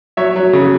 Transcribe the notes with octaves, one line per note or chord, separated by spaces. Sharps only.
F#3 C#5 E5
F#3
C#3